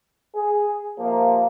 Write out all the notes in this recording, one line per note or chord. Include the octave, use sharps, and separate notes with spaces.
G#4
C3 F3 A#3